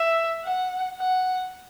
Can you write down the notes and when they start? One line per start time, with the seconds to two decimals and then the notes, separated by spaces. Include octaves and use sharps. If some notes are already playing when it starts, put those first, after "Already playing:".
Already playing: E5
0.44 F#5
0.98 F#5